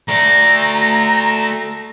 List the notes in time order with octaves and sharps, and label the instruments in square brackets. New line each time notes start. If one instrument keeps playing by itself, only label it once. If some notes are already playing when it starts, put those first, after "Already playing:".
[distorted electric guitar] A3 D5 [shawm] A#5